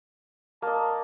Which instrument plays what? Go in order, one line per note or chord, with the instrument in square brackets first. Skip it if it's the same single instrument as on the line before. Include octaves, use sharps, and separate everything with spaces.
[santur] A#3 D#5 [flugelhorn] A5